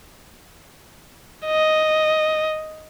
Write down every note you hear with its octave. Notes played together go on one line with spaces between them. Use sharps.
D#5